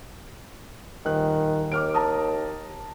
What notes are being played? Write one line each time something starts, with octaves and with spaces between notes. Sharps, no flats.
D#1 D#3 F#6
D#2 D6 F6 D7
A5 A#5 D#6